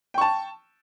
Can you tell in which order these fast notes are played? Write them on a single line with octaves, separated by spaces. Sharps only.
G5 C#6 A5